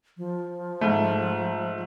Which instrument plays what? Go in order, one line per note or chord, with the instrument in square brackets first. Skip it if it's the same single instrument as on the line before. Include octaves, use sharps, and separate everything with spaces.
[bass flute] F3
[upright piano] G#2 A3